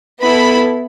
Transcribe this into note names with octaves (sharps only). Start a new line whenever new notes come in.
B3 E4 A4 B5